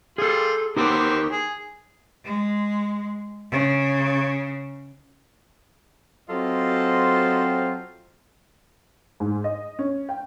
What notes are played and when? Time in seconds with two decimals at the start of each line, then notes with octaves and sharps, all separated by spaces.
0.18 G3 F4 G#4 A4
0.77 B3 C4 D#4 G4 A#4
1.32 G#4
2.24 G#3
3.51 C#3
6.29 F#3 C4 F4 A4 C5 D#5
9.20 G#2
9.44 D#5
9.79 C#4
10.09 G5